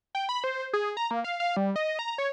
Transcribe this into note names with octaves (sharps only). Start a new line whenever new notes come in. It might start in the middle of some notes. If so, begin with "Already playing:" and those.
G5
B5
C5
G#4
A#5
A#3
F5
F5
G3
D#5
A#5
C#5